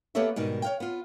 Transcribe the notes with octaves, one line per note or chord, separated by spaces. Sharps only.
A#3 B3 G4 A4 C#5 E5
G#2 B2 D#3 G3
C#5 F5 G5
B3 F4